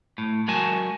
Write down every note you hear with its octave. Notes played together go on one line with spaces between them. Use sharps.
A2
F#3 G#3 F#4 A#4 G#5 A5